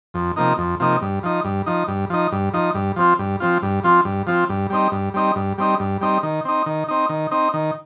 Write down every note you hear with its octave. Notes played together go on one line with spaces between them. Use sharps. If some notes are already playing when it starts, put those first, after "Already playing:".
F2
C3 F3 A#3 D#4
F2
C3 F3 A#3 D#4
G2
F3 D#4
G2
F3 D#4
G2
F3 D#4
G2
F3 D#4
G2
F3 C4 F4
G2
F3 C4 F4
G2
F3 C4 F4
G2
F3 C4 F4
G2
G3 C4 D#4
G2
G3 C4 D#4
G2
G3 C4 D#4
G2
G3 C4 D#4
D#3
C4 D#4
D#3
C4 D#4
D#3
C4 D#4
D#3